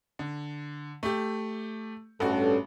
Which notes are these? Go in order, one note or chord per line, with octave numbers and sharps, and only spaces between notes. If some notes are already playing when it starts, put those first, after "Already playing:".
D3
A3 G4
A1 G2 C#4 F#4 A4